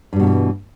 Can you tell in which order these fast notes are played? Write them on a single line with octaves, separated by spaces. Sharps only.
G2 G3 B2 F#3 E3